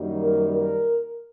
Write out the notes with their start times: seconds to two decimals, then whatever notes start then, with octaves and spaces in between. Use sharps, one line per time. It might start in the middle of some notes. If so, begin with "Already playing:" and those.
Already playing: F#2 D#3 G3 A#3
0.21 A#4
0.53 A#4